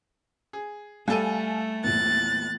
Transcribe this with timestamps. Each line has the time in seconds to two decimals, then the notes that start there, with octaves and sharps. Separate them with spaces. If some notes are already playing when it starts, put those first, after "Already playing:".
0.53 G#4
1.08 G3 A3 A4 F5 G#5 A5 D#7
1.84 A#1 E2 F#6 A6